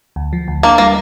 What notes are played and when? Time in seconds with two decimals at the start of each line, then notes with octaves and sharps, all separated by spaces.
0.16 D2
0.33 F3
0.48 D2
0.63 A#3 D4
0.78 G3 A#3